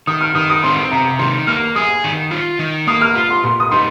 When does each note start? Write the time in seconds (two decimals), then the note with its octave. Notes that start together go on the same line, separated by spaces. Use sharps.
0.07 D#3 D#6
0.21 F6
0.35 D#3 D#6
0.50 D#6
0.63 C4 C6
0.91 C3 A#5
1.19 D#3 C6
1.47 A#3 F6
1.76 G#4 D#6
2.04 D#3
2.31 F4
2.59 D#3
2.87 A#3 D#6
3.01 F6
3.15 F4
3.30 C6
3.44 A#2 C6
3.60 D#6
3.71 D#4 C6